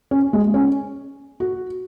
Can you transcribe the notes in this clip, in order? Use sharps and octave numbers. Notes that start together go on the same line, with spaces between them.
C#4
G#3
C#4
F#4